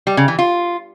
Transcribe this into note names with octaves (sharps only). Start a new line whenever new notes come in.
G3
C#3
E3
F4